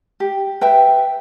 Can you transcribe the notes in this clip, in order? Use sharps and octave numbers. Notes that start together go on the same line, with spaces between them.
G4
B4 E5 G5